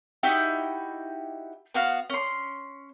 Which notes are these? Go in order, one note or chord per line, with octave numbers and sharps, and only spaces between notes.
D#4 E4 F#4 G4
B3 F#4 F5
C#4 C6